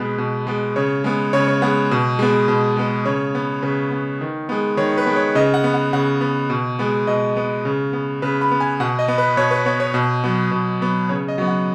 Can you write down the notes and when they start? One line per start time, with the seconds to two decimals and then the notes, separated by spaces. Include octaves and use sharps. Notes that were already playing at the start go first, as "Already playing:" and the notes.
Already playing: B2 G#3 B3 B4
0.18 B2
0.47 G#3 B3
0.76 C#3 C#5
1.04 G#3 B3
1.33 C#3 C#5
1.48 C#5
1.62 G#3 B3 F#5
1.91 B2
2.19 G#3 B3
2.48 B2
2.77 G#3 B3
3.05 C#3 C#5
3.35 B3
3.62 C#3 B4
3.91 B3
4.21 D#3
4.49 G#3 B3
4.77 D#3 C#5
4.98 B4
5.06 G#3 B3
5.16 C#5
5.35 C#3 D#5
5.54 F#5
5.64 B3
5.74 F#5
5.93 C#3 F#5
6.21 B3
6.50 B2
6.79 G#3 B3
7.07 B2 D#5
7.36 G#3 B3
7.65 C#3
7.93 B3
8.22 C#3 B4
8.41 B5
8.51 B3
8.60 G#5
8.80 B2 F#5
8.99 D#5
9.08 B3
9.18 B4
9.37 B2 C#5
9.51 B4
9.66 B3 C#5
9.80 C#5
9.94 B2
10.24 F#3 B3
10.51 B2
10.81 F#3 B3
11.09 C#3 C#5
11.28 D#5
11.38 F#3 B3
11.48 F#5